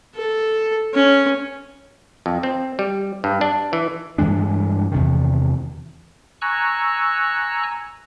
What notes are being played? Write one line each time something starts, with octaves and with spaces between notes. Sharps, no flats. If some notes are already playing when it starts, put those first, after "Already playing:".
A4
C#4
F2
C4
G3
G2
D4
E3
G2 E3 G#3 D4
E2 C3 D#3
G#5 A#5 C#6 E6 F#6